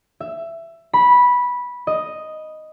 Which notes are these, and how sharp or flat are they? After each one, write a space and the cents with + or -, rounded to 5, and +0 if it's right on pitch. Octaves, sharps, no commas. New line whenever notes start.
E5 +15
B5 -10
D#5 +0